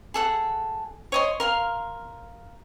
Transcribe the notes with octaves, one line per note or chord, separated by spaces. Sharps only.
G#4 A4 F#5
C#5 D#5 C6
A#4 F5 C6